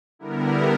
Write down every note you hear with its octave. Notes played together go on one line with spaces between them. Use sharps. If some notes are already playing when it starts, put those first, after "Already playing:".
D3 G3 B3 E4 A#4